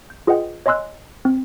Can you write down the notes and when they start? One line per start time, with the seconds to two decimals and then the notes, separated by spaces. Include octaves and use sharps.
0.10 G6
0.27 F4 G#4 B4 D#5 F#5 G5
0.66 C#5 D#5 G#5 C6 E6 F#6
1.25 C4